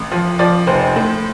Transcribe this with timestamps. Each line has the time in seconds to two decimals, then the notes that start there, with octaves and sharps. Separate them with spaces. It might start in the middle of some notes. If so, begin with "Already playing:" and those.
Already playing: A1
0.11 F3
0.39 F3 D5
0.67 F1 C5
0.96 A2